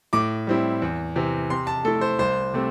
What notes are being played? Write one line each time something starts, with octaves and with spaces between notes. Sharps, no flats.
A2 D6
G3 C4 E4
E2
C3 E3 C4
C3 C6
A5
A3 E4 A4
C5
C2 C5
C3 A3 C4